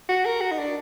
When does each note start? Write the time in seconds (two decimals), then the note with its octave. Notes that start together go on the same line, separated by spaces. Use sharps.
0.09 F#4
0.25 A#4
0.41 F#4
0.51 D#4
0.58 D4